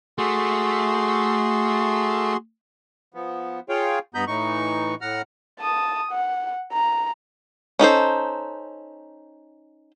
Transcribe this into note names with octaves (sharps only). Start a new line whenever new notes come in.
A3 F#4 G#4 C6
F3 B3
F4 G#4 C#5 F5 G5
G2 B3 D#5 A#5 B5 G6
A2 E3 D#4 C#6
A2 F#5 A#5 F6
A5 D#6
F#5
A#5
C#4 D#4 A4 C5